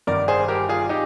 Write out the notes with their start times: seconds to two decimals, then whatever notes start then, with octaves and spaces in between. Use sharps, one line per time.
0.07 G1 G2 D#3 A#4 D5
0.28 G#4 C5
0.48 G4 A#4
0.69 F4 G#4
0.89 D#4 G4